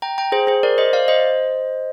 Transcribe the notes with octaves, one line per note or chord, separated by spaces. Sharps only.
G5 A#5
G5 A#5
G#4 C5
G#4 C5
A#4 D5
C5 D#5
D5 F5
C5 D#5